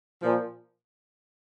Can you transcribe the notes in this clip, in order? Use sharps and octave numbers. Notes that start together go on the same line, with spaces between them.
A#2 F3